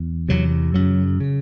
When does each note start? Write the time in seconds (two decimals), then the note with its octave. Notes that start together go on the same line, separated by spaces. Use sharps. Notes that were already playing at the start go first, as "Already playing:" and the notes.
Already playing: E2
0.28 E2 C3 F#3
0.74 F#2 C#3 F#3
1.20 C#3